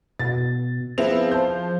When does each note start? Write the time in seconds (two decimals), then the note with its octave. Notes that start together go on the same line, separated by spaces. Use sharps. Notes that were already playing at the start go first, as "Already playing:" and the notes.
0.19 B2 A6
0.98 F3 B3 C4 E4 G#4 E5 F7
1.31 C5 A5 G6